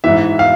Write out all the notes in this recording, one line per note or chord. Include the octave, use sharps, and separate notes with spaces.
G#2 E3 E5
F5